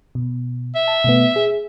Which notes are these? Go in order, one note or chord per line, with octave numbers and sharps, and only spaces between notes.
B2
E5
A5
B2 A3 B3
G#4